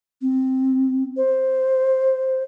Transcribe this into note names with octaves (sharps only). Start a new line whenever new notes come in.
C4
C5